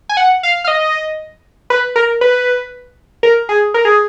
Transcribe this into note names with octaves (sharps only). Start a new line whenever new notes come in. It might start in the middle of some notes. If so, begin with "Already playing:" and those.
G#5
F#5
F5
F5
D#5
B4
A#4
B4
A#4
G#4
A#4
G#4